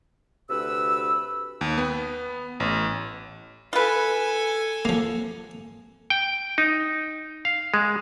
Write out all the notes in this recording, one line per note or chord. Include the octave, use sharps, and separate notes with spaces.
D2 C3 B4 E6
D#2
B3
A1
F4 A4 B4 G#5
F3 A#3
G5
D#4
F5
G#3